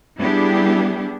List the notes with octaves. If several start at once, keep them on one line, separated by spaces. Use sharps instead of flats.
G3 B3 D4 E4 G4 G#4